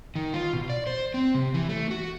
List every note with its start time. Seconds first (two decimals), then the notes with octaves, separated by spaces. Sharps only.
0.15 D#3
0.34 F4
0.53 B2
0.70 D5
0.87 C5
1.14 C4
1.34 C3
1.54 E3
1.69 A3
1.91 F#4